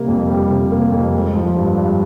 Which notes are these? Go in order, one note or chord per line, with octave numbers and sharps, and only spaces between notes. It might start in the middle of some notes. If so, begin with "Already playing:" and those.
Already playing: C3 G3 A#3
F2
G3
C3
A#3
F2
G#3
F3
G2
G2